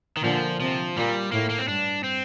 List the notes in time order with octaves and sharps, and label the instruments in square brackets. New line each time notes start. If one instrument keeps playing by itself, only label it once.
[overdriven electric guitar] D#3
[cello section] A#2 D3 [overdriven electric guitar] F3
[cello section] C3 [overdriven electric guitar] F3
[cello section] A#2 [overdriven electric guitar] G3
[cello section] A2 [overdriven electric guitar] A#3
[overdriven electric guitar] A#3
C4
[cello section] G2 [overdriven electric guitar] D4
[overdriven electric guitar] C4